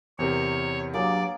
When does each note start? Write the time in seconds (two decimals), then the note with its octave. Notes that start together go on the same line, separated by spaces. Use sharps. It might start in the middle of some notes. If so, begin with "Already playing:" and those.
0.19 E2 C3 A#4 C#5
0.94 G2 F#3 A#3 G#4 D5